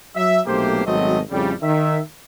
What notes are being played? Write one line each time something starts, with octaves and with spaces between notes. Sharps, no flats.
F#3 E5
B1 C3 A3 A#3 G4 C5
G#1 B2 F#3 A3 C4 D#5
F2 A2 C#3 G3
D#3 E5